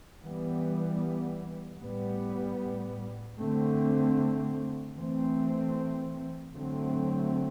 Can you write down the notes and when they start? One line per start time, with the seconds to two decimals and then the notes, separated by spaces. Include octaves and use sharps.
0.22 E3 G3 B3
1.80 A2 G3 B3
3.38 D3 A3 C4
4.96 E3 A3 C4
6.54 D3 F#3 A3 C4